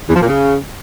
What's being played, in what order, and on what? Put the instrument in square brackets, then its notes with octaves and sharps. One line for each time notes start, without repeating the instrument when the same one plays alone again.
[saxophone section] E2
F3
A#2
C#3